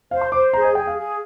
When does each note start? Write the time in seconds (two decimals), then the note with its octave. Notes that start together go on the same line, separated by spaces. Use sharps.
0.11 C5 F5
0.21 C6
0.32 C5 D6
0.53 G#4 A#5
0.64 D#5
0.75 G#4 G5
0.87 F5
0.98 G#4